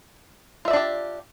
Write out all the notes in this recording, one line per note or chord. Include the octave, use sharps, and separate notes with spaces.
D4 F4 G4 D5 E5